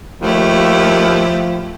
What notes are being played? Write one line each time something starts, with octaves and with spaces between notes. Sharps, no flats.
D#2 F3 A3 E4 G4